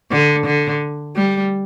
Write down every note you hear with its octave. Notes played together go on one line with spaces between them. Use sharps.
D3
D3
G3